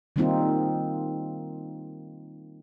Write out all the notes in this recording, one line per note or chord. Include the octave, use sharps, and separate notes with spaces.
D#3 G3 A#3 C4 D#4 F4